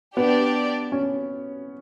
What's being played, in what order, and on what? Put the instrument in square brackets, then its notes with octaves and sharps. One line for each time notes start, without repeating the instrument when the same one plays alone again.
[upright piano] B3 [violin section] D4 G4 D5
[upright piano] C#4